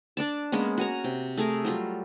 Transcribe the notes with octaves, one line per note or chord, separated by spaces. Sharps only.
D4 D5 A5
G#3 A#3 B3 C#4
F#4 G#5 A#5
C3
A3 G#4 A#4
F#3 G3 F4